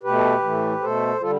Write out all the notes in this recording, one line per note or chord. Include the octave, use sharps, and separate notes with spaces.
B2 A3 G4 B4
A2 E3 A3
B2 A3 A4 C5
D3 G3 F4 A4